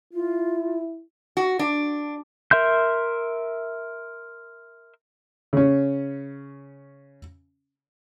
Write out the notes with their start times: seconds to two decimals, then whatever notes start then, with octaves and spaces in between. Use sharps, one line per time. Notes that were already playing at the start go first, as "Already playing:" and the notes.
0.13 E4 F4
1.37 F#4
1.59 D4
2.51 A#4 E5 C6 G6
5.53 C#3 C#4